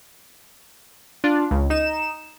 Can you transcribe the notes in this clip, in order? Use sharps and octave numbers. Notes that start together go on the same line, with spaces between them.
D4 F4
C#2
D#4 E7